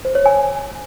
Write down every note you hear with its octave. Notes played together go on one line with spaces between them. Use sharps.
C5
C#5
G#5